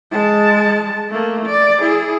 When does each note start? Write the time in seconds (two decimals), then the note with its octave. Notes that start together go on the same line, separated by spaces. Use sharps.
0.11 G#3 A5
1.10 A3 A#3
1.46 D5
1.81 E4 G#4